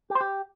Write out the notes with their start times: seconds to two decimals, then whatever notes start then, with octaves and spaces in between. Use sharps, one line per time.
0.10 G4
0.15 C5
0.21 G4